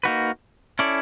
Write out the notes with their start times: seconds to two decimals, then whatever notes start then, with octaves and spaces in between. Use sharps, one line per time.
0.03 A#3 D#4 F#4 B4
0.79 C#4 E4 A4 D5